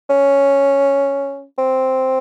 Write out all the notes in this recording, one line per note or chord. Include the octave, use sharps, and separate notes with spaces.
C#4
C4